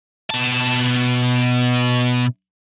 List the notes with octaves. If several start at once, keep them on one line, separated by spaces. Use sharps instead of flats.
B2 A5